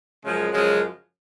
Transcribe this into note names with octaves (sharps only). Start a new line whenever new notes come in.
F#2 C#3 F3 G#3
F#2 C#3 F3 G#3